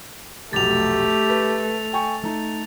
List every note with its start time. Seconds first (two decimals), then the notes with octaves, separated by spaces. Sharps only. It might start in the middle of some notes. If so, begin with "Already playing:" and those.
0.53 F1 B1 A3 G4 A6 F7
1.29 B4
1.93 G5 G#5 C#6
2.23 A3 D#4